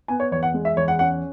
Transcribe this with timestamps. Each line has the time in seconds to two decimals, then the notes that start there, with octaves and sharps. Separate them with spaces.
0.08 B3 G#5
0.20 C#5
0.32 E2 C#5
0.43 F#5
0.54 G#3
0.65 E5
0.76 E2 C#5
0.88 F#5
0.99 C#4 F#5